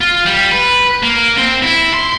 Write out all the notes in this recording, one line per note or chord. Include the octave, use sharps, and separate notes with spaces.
F4
G3
B4
A#3
C4
E4
C6